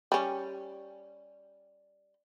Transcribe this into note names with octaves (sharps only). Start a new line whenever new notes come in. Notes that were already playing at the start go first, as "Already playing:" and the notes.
G3 C#4